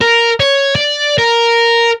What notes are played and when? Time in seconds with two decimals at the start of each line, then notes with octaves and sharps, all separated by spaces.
0.01 A#4
0.40 C#5
0.75 D5
1.18 A#4